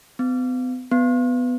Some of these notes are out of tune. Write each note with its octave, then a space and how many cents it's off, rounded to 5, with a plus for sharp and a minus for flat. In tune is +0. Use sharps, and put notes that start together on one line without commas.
B3 +40
B3 +10